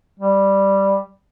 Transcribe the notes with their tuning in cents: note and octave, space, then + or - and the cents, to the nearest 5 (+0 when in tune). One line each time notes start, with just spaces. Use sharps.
G3 +0